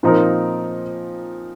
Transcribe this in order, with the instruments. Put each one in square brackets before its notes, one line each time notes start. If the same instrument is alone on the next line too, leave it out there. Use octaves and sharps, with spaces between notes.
[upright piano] A#2 F3 C4 D#4 A#4